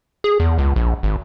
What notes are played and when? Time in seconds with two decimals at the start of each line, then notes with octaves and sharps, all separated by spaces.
0.24 G#4
0.40 E2
0.58 C#2
0.76 A#1
1.03 G#1